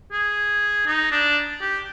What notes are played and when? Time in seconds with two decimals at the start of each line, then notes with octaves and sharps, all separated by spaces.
0.11 G#4
0.86 D#4
1.11 D4
1.61 G4